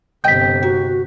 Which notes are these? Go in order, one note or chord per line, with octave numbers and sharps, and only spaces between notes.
G1 C3 D#5 G5 G6 B6
D#4 F#4